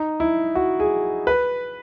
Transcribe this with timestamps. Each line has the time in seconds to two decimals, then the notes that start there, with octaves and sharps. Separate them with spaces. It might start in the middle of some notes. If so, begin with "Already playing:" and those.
Already playing: D#4
0.20 E4
0.55 F#4
0.80 G#4
1.27 B4